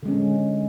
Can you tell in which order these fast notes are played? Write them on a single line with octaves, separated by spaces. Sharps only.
D3 G#3 C#4